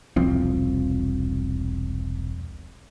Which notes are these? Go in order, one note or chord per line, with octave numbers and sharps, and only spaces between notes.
E1 C2 F3 C4